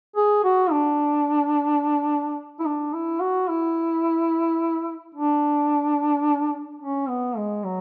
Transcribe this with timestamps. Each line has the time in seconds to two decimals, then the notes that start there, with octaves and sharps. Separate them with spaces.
0.16 G#4
0.44 F#4
0.71 D4
2.60 E4
2.66 D4
2.93 E4
3.21 F#4
3.48 E4
5.15 D4
6.81 C#4
7.09 B3
7.37 G#3
7.64 F#3